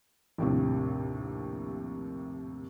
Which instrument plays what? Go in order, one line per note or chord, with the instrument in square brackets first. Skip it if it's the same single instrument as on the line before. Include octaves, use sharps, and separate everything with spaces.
[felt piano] A#1 D#2 A2 C3